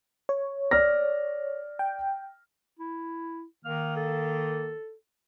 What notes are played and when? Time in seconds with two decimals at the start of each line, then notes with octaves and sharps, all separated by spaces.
0.29 C#5
0.71 D5 F6 A#6
1.79 G5
2.79 E4
3.65 D#3 A#3 F6
3.96 A4